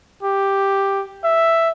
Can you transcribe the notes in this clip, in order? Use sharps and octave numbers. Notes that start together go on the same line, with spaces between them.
G4
E5